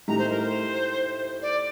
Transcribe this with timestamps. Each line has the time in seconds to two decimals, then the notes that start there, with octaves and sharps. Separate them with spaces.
0.08 A2 A3 D#4 G4 A#5
0.19 C5
0.30 A#4
0.42 C5
1.42 D5